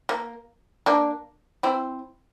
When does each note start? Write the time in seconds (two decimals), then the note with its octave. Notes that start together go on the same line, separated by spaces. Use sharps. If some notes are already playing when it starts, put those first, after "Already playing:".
0.09 A#3
0.86 A#3 D4
1.63 C4 E4